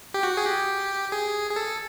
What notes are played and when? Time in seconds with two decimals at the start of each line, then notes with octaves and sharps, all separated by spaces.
0.14 G4
0.23 F#4
0.37 G#4
0.46 G4
1.12 G#4
1.50 G#4
1.56 A4